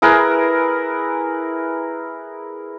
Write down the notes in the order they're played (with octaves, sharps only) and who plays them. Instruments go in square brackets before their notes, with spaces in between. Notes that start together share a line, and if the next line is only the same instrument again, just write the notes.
[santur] E4 G#4 A#4 B4